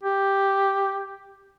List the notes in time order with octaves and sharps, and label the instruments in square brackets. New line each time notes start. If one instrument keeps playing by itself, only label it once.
[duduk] G4